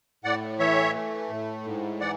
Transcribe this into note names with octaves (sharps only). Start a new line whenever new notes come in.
A2 D5 F#5
E3 C#5 E5
A3
A2
G#2
E3 D5 F#5